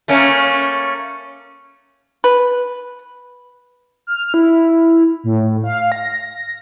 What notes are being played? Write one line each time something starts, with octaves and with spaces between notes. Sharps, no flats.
A3 A#3 C#4
B4
F6
E4
A2
F5
A#6